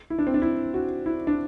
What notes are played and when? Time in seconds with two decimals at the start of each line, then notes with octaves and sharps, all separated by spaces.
0.10 E4
0.19 D4
0.27 C4
0.34 D4
0.42 E4
0.74 F#4
1.06 E4
1.27 D4